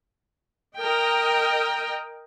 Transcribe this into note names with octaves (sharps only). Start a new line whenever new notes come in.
A#4 D#5 G5